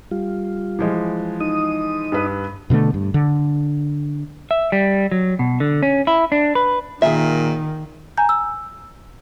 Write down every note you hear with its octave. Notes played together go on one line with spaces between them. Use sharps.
G3 F4
E3 F3 G#3
D#4 D#6
G2 B4
B2 D3 G#3 A3
G2
D3
E5
G3
F#3
B2
D3
C#4
E4
D4
B4
A#2 D#3 G#4 E5
G#5 A#5 G6
E6